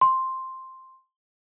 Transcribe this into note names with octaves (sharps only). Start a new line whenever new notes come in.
C6